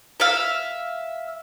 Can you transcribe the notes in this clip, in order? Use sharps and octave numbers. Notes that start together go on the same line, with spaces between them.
E5 F5